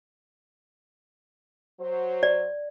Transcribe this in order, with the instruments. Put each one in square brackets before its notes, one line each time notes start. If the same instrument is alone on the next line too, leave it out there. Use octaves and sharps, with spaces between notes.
[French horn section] F#3 C5
[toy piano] D5